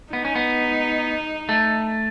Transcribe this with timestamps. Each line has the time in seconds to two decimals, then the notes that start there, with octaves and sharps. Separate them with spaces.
0.13 B3 D#4
0.25 C#4
0.35 B3
1.49 A3